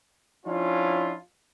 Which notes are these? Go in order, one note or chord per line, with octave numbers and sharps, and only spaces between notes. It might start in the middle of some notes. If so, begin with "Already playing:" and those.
F3 C#4 D4 E4 F4